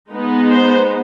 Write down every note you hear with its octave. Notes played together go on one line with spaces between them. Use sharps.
G#3 B3 D#4
C5